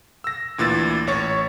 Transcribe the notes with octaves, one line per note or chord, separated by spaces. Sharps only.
E6 A#6
D2 A#2 E3 E6 A6
A1 C#5 C#6 A6